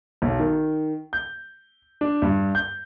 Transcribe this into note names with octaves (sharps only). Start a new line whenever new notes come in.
B1
D#3
G6
D4
G2
G6